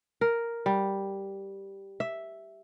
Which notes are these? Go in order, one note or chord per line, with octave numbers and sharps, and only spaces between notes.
A#4
G3
E5